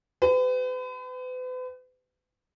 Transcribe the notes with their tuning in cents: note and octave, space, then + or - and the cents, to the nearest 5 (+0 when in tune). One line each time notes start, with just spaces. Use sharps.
G4 +20 B4 +40